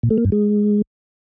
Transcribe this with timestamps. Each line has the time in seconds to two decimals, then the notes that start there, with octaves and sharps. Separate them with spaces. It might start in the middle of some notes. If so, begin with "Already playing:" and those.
0.03 A#2
0.10 A3
0.18 A#3
0.25 G2
0.32 G#3